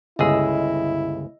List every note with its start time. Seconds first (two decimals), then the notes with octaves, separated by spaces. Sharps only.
0.19 G1 C#2 E4 G#4 D#5 E6